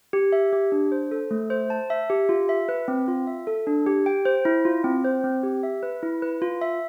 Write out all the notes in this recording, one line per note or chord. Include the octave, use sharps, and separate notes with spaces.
G4
E5
G4
D4
C5
A4
A3
C5
A5
E5
G4
F4
E5
B4
C4
F4
E5
A4
D4
G4
G5
C5
E4
F4
C4
C5
C4
G4
E5
B4
E4
B4
F4
E5